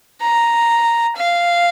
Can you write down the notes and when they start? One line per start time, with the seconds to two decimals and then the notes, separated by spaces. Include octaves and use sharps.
0.21 A#5
1.16 F5